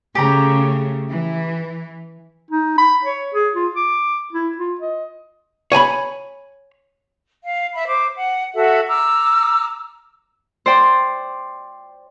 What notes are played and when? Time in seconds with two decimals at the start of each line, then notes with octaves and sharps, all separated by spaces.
0.15 C#3 A3 G4 A#5
1.11 E3
2.51 D#4
2.78 B5
3.05 C#5
3.34 G#4
3.55 F4
3.76 D6
4.33 E4
4.58 F4
4.81 D#5
5.72 C#5 G#5 A#5 B5
7.43 F5
7.74 E5 B5
7.87 C5 D6
8.15 F#5
8.54 F#4 A4 E5 F#5
8.87 A#5 D6 E6 F6
10.66 C5 D5 G5